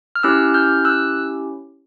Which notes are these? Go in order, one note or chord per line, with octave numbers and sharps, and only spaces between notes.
F6
C#4 E4 G4 E6 F#6
F6 G6
E6 F#6